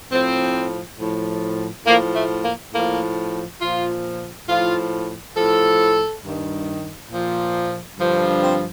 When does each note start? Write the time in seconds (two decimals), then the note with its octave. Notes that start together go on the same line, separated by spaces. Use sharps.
0.12 A2 F3 C4
0.98 A2 F3
1.86 A2 F3 A#3
2.16 A3
2.44 A#3
2.73 A2 F3 A#3
3.61 A#2 F3 F4
4.48 A2 F3 F4
5.36 A2 F3 A4
6.23 G2 D#3
7.10 A#2 F3
7.98 G2 D3 F3
8.41 C4